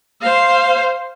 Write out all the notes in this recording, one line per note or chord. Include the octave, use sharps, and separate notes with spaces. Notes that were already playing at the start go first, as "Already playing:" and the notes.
C5 F5